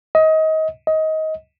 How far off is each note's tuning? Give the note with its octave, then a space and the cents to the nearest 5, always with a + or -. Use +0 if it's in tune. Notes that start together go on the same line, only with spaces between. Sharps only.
D#5 +25
D#5 +20